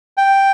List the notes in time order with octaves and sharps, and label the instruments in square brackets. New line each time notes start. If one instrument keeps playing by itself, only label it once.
[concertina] G5